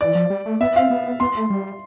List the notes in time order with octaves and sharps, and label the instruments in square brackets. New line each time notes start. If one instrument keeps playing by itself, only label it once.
[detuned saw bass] E3 [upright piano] D5
[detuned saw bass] F3
G3
A3
[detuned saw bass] B3 [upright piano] E5
[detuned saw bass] B3
[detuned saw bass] C4 [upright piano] F5
[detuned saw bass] B3
[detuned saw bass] B3 [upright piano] C6
[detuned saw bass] A3
G3